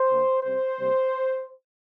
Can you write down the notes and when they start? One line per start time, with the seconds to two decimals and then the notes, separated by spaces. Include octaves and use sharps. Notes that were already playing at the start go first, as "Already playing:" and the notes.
Already playing: C5
0.08 D3 A#3
0.43 C3 G3 C4 C5
0.77 C3 G3 A#3